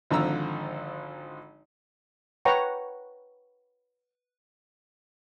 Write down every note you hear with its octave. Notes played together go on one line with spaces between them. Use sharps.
G#1 D3 F3 A#5 E6
B4 C#5 F#5 G5 A#5 C#6